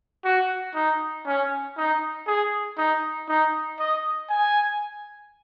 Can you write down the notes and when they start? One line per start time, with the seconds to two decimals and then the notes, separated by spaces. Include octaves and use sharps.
0.25 F#4
0.75 D#4
1.26 C#4
1.77 D#4
2.27 G#4
2.77 D#4
3.28 D#4
3.79 D#5
4.29 G#5